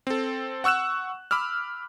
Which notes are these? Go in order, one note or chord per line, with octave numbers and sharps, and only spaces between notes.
C4 A4
F#5 C#6 E6 F#6 E7
B5 D6 E6 F6